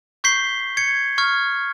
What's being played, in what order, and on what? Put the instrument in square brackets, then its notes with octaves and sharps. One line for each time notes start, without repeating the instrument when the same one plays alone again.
[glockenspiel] C#6 G6 B6 C7 G7
G#6 C#7
C#6 F6 G#6